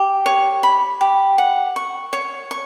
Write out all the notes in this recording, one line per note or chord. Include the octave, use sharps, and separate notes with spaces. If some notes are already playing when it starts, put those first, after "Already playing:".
Already playing: G4
C#5
B5
G4
F#5
C#6
C#5
C#6